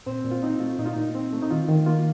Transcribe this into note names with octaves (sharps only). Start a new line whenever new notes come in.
A#2 C4 C5
A#2
F4
C4 D#4
A3 F4
A#2 D#4
F4
A#2 D#4
C4
A3
D#4
D#3 F4
D#3
A#3 F4